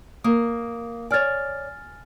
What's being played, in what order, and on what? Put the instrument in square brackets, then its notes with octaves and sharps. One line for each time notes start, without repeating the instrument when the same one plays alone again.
[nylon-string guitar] A#3 [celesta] A#4 D#6
[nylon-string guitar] C#5 D5 [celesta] G#5 F6 A6